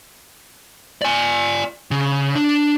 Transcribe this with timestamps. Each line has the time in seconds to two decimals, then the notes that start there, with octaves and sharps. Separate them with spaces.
1.02 D5 G#5
1.91 C#3
2.35 D4